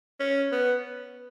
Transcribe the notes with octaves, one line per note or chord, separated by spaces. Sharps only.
C#4
B3